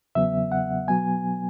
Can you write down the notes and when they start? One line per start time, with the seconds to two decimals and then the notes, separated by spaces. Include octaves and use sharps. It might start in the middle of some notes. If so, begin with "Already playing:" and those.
0.15 E2 C#3 F#3 B3 E5
0.52 F#5
0.88 B2 F#3 B3 G#5